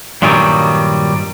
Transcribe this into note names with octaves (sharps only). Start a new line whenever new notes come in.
G2 A#2 D#3 F#3 G3